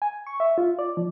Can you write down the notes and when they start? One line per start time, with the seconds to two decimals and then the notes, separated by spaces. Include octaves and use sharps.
0.02 G#5
0.27 C#6
0.40 E5
0.58 F4
0.79 D5
0.97 F3